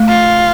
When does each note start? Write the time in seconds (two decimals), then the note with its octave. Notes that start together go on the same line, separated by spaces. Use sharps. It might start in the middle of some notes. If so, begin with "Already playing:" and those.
Already playing: A3
0.09 F4